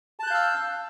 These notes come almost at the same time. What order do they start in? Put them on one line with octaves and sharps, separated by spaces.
A5 F#6 G6 F5 E6